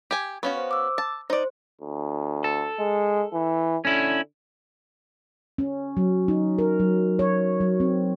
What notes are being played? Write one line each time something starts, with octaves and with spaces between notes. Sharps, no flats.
G4 G#5
B3 C#4 F#4 F5 C#6
C5
D6 E6
A5
D#4 C5 D5
D2
A4
G#3
E3
D3 C#4 E4
C#4
F#3
D#4
A#4
F#3
C#5
F#3
C4